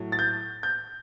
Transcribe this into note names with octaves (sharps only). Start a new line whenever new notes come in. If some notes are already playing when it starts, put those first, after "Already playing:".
Already playing: A2 F#3
A6
G6
G6